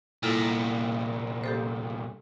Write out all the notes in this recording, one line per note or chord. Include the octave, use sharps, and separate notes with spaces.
C2 A#2 E4 F4 A4
G4 A4 C5